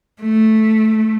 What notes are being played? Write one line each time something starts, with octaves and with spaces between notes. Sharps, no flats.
A3